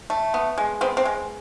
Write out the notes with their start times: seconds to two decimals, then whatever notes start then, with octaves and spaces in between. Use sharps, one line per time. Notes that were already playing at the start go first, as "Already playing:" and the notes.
0.10 A3
0.34 B3
0.58 G#3
0.81 B3 C4
0.97 C4
1.05 G#3